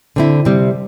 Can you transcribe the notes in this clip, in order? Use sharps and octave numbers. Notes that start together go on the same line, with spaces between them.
D3 C4 E4
C3 G3 C4